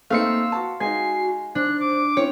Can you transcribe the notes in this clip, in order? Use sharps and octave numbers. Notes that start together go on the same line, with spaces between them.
A3 A#3 C4 D#4 F5 C6 E6 C#7
F#4 A5
G#3 D#4 F#4 G#5 C7
D4 C5 F#6
D6
C4 C#4 E4 C#5